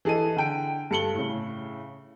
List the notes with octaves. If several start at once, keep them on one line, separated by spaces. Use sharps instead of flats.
E3 G#4 A4 D#5 D#7
D3 G5 D7
G2 A4 C#7 F#7 G7
A2 C#3